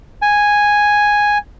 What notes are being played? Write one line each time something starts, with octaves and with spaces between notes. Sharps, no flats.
G#5